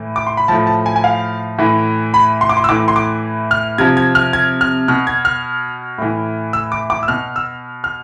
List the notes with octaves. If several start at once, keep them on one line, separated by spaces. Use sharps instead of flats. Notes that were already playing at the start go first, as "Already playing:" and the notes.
Already playing: A2 E3
D6
C6
B5
A2 F3 A5
A5
G#5
G#5
F5
A2 E3
B5
C6
D6
C6
E6
A2 E3 D6
C6
D6
F6
C3 F3 G#6
G#6
F6
G#6
F6
B2 F6
G#6
F6
A2 E3
E6
D6
D6
E6
B2 F6
E6
F6